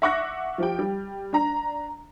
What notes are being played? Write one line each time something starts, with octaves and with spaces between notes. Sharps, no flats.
E5 F#5 C#6 D6 F#6 A#6
F3 G4 G5
G3
D4 A#5